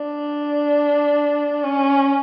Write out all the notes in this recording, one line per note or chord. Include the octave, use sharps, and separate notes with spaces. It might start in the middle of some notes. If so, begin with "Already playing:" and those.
Already playing: D4
C#4